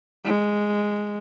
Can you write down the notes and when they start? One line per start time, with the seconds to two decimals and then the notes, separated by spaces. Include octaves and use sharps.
0.25 G#3